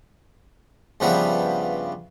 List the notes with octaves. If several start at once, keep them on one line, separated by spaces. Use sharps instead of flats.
G2 C#3 F3 G3 B3 E5